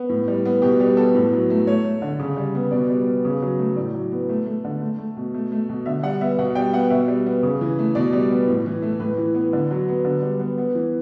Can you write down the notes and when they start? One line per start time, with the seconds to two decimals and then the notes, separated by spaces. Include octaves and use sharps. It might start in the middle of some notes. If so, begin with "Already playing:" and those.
Already playing: B3
0.09 A2
0.28 G3
0.45 B3
0.62 B2 G4
0.80 G3 G4
0.97 B3 A4
1.15 A2
1.33 F#3
1.50 A3
1.67 A3 C#5
1.85 A3
2.02 D3
2.19 C#3
2.37 G3
2.55 B3
2.71 B2 D5
2.90 G3
3.06 B3
3.25 C#3
3.42 F#3
3.59 A3
3.77 A2 D5
3.94 F#3
4.12 B3
4.29 A3
4.46 A3
4.64 D3
4.81 A3
4.99 A3
5.17 B2
5.34 A3
5.52 A3
5.69 B2
5.86 D3 E5
6.03 G3 F#5
6.21 B3 E5
6.39 B2 F#5
6.55 G3 G5
6.73 B3 F#5
6.90 B2 E5
7.08 G3
7.26 B3
7.43 C#3
7.61 E3
7.79 A3
7.95 B2 D5
8.13 G3
8.31 B3
8.48 A2
8.66 E3
8.82 A3
9.00 A2 B4
9.17 E3
9.35 B3
9.53 D3
9.71 F#3
9.88 B3
10.05 D3
10.22 G3
10.40 B3
10.58 B3
10.75 E3